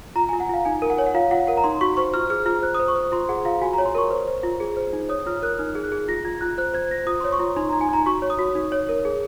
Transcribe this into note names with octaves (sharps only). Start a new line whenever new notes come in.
F4 A#5
F4 G#5
F#5
F4 F5
D#4 G#5
A#4
F#5
C#5 G#5
F#5
F4 F5
F4 F#5
A#4 F#5
A#5
D#4 C6
F#4 C#6
C5 C#6
F4 F6
G#4 F6
F4 F6
C5 F#6
C5 D#6
C#6
C5
F4 C6
G#4 F#5
F4 F5
F#4 G#5
C#5 A#5
C6
A#4 C#6
C5
C5
F4
G#4
C5
D#4
C#5 D#6
F4 F6
A#4 F#6
D#4 F6
G#4
F#6
G#4
F4 A#6
F4 G#6
F4 F#6
C5 F#6
C5 G#6
C5 A#6
F4 D#6
C#5 C6
C#6
F4
D#4 C6
D#4 A#5
G#5
D#4 A#5
F#4 C#6
C#5
D#6
F#4
D#4
C#5
A#4
G#4